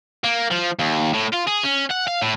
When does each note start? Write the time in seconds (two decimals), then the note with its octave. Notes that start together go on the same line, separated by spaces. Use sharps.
0.24 A#3
0.51 F3
0.79 D#2
1.14 A2
1.33 F4
1.47 G#4
1.64 C#4
1.91 F#5
2.08 F5
2.22 A2